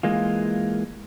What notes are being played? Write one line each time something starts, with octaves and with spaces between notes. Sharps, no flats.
E3 G#3 A#3 F4